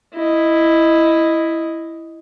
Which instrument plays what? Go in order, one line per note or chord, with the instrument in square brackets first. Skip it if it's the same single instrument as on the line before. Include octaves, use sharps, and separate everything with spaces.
[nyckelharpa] E4 D#5